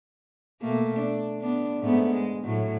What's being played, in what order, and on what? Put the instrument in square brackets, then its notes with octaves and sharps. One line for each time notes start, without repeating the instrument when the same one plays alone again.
[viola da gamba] B2 A3 A#3
D4
B3 D4
G#2 A3 B3
G#3
A2 F#3